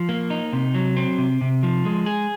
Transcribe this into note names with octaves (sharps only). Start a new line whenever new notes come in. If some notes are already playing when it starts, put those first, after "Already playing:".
Already playing: F3
A#3
D#4
C3
F#3
C4
C3
C3
F3
G#3
G#4